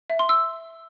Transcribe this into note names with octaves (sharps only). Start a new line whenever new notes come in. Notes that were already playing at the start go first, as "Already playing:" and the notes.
E5
C6
E6